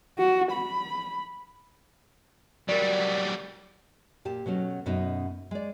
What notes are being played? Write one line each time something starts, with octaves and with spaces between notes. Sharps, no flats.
F#4
B5
F#3 G3 A#4 D5
A#2 G4 A5
B2 F#3 A3 C#4
F#2 B2 A3 C#4 D#4
G#3 D5